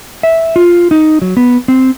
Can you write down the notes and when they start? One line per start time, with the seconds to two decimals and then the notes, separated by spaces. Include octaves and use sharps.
0.23 E5
0.56 F4
0.91 D#4
1.22 F#3
1.37 B3
1.68 C4